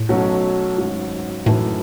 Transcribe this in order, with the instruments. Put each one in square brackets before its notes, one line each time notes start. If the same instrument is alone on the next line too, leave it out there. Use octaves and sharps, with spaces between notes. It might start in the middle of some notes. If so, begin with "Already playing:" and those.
Already playing: [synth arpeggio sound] A2
[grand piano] B1 B2 F#3 A3 C#4
G#1 G#2 F#3 C#4
[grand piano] G#1 F#2 E3 A3 E4 [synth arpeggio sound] A2